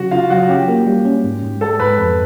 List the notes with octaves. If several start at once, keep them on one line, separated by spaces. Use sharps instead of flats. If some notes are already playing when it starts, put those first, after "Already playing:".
Already playing: C#3 F#3 F#4 F#5
C#3 F4 F5
F#3 F#4 F#5
C#4 G4 G5
A#3
G3
C#4
G#2
G#2
G#3 A4 A5
G#2 B4 B5
F2